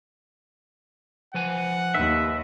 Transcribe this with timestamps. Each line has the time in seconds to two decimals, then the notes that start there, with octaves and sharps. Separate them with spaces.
1.34 F3 B4 F#5 G#5
1.94 D#2 B4 E5